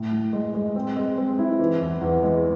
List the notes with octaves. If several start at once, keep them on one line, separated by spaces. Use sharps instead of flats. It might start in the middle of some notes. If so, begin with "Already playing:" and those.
Already playing: A2
A2
G#3
G#3
C4
G#3
C4
E4
E3
E2
E2
G#3